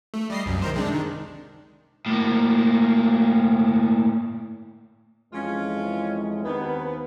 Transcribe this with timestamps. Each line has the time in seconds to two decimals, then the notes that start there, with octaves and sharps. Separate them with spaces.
0.14 A3
0.30 G3 D#5 C7
0.46 C2 F#2
0.62 D#3 A#4 C5
0.74 C3 G#3 D4
0.91 D#3
2.06 A2 A#3
5.33 F2 E3 G#3 C#4 F4
6.44 D#2 B3 C4 B4